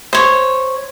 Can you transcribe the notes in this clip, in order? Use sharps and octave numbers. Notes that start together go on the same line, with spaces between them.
C5 C#5